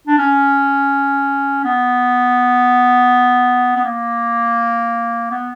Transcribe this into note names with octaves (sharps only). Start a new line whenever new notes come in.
D4
C#4
B3
B3
A#3
B3